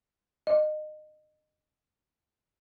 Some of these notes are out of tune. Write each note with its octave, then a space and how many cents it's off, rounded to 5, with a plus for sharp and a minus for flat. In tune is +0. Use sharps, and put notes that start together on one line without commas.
D#5 -25